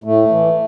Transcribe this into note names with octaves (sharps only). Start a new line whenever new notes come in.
A2 A3
E3